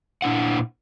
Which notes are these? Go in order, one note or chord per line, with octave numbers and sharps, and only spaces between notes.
A#2 D4 E4 F#5